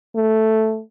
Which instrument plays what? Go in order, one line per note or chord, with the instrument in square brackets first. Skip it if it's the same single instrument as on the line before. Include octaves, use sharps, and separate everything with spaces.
[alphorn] A3